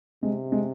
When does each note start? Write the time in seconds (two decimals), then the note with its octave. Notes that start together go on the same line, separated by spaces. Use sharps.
0.23 C3 G#3
0.52 G#3